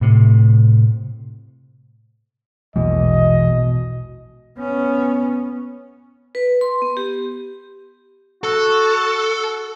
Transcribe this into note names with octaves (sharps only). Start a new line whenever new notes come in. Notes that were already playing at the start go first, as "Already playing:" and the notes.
A2 C3
A#1 E2 B2 G#3 D#5
B3 C#4
B4
C6
B3
G4
F#4 A4